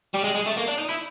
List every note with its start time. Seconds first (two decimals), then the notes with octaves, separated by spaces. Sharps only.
0.14 G3
0.24 G#3
0.35 G#3
0.47 A3
0.58 A#3
0.68 D4
0.78 D#4
0.89 E4